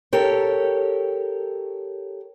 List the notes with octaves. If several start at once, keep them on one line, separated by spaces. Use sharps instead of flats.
G4 A4 A#4 C#5